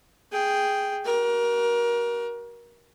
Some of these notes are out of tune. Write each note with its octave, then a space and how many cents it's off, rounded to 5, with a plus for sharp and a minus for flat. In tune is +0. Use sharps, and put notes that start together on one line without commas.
G#4 +0 G5 +0
F#4 +40 A#4 +25